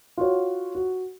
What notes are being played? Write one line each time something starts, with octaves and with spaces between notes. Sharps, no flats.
F4 F#4 C#5
F#4